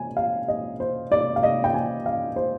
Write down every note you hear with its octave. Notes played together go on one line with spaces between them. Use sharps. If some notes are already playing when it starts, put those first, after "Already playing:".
Already playing: G#5
F5
D#5
C5
D5
F5
D#5
G5
G#5
F5
C5